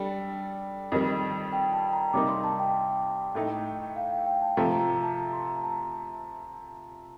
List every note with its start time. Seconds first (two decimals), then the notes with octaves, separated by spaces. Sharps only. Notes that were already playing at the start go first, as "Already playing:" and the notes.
Already playing: G3 D4 A4 G5
0.92 F2 D#3 G3
1.52 G5
1.73 A5
1.93 A#5
2.13 C3 G3 A#3 D#4 D6
2.29 C6
2.44 A5
2.59 G5
3.35 A2 A3 D#4
3.96 F5
4.12 G5
4.26 G5
4.42 A5
4.57 C3 F3 A3 A#5
4.72 A#5
4.87 A#5
5.03 A5
5.18 A#5
5.33 C6
5.48 A#5
5.64 A5